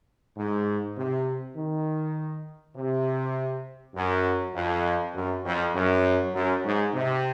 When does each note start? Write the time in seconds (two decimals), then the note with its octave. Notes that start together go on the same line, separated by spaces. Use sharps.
0.36 G#2
0.97 C3
1.57 D#3
2.76 C3
3.95 F#2
4.54 F2
5.14 F#2
5.45 F2
5.75 F#2
6.33 F#2
6.64 G#2
6.93 C3